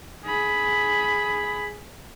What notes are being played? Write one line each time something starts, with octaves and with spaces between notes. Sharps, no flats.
G#4 B5